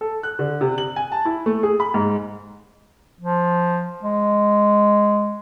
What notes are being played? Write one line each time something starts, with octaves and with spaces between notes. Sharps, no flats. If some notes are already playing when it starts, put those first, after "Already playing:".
A4
F#6
D3
C3
F#7
G#5
A5
E4
A3
G#4
B5
G#2
F3
G#3